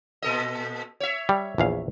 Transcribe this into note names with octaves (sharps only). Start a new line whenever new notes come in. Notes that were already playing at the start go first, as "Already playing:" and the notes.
A#2 A4 D#5
C#5 E5
G3
A#1 E2 F5